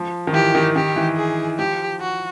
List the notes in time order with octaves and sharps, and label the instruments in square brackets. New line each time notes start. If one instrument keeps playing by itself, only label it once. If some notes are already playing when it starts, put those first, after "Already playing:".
Already playing: [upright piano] F3
D#3
[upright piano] E3 [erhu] G4
[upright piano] D#3
[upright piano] D#3 [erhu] G4
[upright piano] E3
[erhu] G#4
[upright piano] F3 [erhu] G4
[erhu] F#4